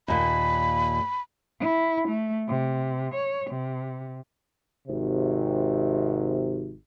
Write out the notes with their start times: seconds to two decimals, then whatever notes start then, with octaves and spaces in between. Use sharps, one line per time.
0.08 D#2 A#2 B5
1.60 E4
2.08 A3
2.48 C3
3.14 C#5
3.51 C3
4.88 G#1 C3